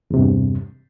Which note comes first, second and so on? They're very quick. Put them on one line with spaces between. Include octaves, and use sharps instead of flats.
E2 C3 G2